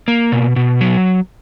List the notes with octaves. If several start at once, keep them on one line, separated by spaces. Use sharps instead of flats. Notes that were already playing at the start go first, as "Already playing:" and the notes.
A#3
B2
B2
F#3